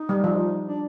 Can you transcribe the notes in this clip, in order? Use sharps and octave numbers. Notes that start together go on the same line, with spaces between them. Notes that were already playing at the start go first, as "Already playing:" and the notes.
Already playing: D#4
G3
F3
D4